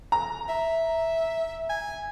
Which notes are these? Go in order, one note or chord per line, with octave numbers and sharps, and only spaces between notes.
A#5
E5
G#5